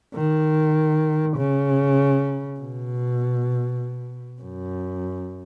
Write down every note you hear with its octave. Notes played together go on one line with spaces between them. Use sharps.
D#3
C#3
B2
F#2